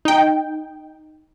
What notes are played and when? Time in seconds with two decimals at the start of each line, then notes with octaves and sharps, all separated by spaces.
0.05 D#4 G5